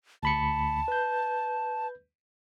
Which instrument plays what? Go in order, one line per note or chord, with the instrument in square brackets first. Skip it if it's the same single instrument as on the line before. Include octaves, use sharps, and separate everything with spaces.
[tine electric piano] D2 B5 C#7 [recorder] A5
[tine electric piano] B4 G6